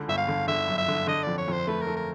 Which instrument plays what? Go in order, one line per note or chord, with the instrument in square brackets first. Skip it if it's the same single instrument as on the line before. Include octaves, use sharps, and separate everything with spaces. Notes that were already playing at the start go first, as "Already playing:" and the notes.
Already playing: [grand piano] C#2 D3
[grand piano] G1 [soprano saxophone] E5
[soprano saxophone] F5
[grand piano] D3
[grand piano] D3 [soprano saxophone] E5
[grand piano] F#2
[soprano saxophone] E5
[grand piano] D3
[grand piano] D3 [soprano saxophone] D#5
[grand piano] F2 [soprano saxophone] D5
[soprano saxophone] C#5
[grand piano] F2 [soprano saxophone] C5
[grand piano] A3 [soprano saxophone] B4
[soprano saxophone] A#4
[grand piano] A3
[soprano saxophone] A#4